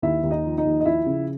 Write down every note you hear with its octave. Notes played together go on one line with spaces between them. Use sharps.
D#2 E4 E5
D#2
D#4 D#5
F3
D#4 D#5
D#2
D#5
F3 E4 E5
C#3